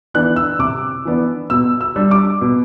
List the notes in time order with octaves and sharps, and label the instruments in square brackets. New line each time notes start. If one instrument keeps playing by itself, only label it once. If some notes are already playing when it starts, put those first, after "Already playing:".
[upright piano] E3 B3 D4 F#6
E6
C3 D6
E3 B3 D4
B2 E6
E6
G3 D4
D6
B2